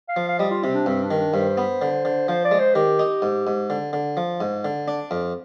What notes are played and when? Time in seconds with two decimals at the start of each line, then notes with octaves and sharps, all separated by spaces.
0.09 F5
0.16 F3
0.28 F5
0.39 G3 D#5
0.51 F4
0.64 C3 C4
0.74 D4
0.86 G2 C4
1.03 D4
1.11 D#3
1.19 D4
1.33 G2 C5
1.57 B3
1.82 D3
2.05 D3
2.28 F3 C5
2.45 D5
2.51 G#3
2.59 C5
2.75 D#3 G4
2.99 D#4
3.22 G#2
3.47 G#2
3.70 D3
3.93 D3
4.17 F3
4.41 G#2
4.65 D3
4.88 D4
5.11 F2